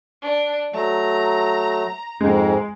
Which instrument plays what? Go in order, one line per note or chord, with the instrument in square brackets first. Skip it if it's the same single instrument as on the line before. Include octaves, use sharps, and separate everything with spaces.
[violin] D4
[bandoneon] F#3 A3 [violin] A#5
[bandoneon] F2 G#2 [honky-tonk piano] G#3